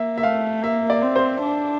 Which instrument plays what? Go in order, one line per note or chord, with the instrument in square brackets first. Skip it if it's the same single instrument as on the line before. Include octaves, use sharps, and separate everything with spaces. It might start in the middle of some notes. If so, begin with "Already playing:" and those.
Already playing: [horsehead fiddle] A#3 [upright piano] E5
[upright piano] E5
[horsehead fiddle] A3 [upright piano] F5
[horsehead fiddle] A#3 [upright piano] E5
[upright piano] D5
[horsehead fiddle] C4
[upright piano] C5
[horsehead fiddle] D4